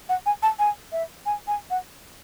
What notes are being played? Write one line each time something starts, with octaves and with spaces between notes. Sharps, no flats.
F#5
G#5
A5
G#5
E5
G#5
G#5
F#5